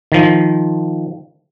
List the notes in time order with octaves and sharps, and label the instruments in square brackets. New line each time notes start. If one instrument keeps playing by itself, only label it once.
[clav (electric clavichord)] D#3 F3